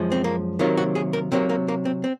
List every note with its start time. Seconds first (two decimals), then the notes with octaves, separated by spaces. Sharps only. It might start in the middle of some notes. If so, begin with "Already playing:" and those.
Already playing: F#2 F3 G#3
0.12 C4
0.24 A#3
0.59 C3 D#3 F#3 A#3 F4
0.77 F#4
0.95 G#4
1.13 A#4
1.32 C3 F#3 A#3 C4
1.49 A#3
1.68 A#3
1.85 C4
2.04 C4